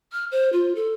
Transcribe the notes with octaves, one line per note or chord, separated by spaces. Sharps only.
F6
C5
F4
A4